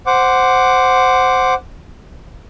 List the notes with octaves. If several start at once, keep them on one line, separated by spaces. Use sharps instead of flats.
C5 F#5 D6